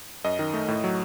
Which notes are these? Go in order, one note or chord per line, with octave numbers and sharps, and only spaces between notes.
F#2 D#5
D#3
A3
A2
F#3